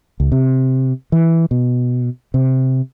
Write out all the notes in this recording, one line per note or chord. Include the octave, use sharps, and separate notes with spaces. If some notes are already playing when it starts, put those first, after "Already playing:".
C#2
C3
E3
B2
C3